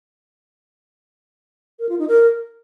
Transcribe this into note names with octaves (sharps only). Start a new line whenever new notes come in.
A#4
F4
D#4
A#4